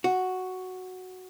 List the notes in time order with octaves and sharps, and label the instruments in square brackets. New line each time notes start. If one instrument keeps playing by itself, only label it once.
[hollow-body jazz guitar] F#4